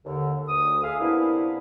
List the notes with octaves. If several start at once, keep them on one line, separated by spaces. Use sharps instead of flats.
D#2 D3
D2 D#6
G#4 E5 F5
C3 A#3 B3 D4 E4